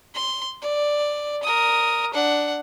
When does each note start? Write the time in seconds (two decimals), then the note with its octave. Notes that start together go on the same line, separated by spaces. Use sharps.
0.14 C6
0.62 D5
1.43 A#4 D#6
2.13 D4 F#5